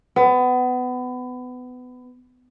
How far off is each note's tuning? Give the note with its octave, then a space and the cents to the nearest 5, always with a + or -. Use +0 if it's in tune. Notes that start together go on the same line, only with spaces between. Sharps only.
B3 +25